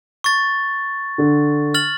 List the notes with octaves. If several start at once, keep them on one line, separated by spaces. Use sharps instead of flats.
C#6 A6
D3
F6 A6 F#7